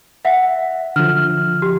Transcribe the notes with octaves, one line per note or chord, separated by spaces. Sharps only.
E5 F#5
D3 F3 F6
G4